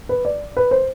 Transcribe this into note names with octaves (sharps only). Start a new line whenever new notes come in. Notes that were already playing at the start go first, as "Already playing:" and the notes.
B4
D5
B4
C5